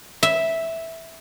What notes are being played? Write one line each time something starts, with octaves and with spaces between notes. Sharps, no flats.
E5